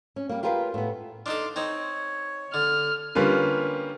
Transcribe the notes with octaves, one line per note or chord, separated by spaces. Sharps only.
C#4
G3 A#3
F4 G4 G#4 A#4 B4 F5
A2 B3
D4 D#4 A4 C6 D6 F6
C4 D#4 C#5
D3 F6
D3 G3 A#3 C#4 F4 B4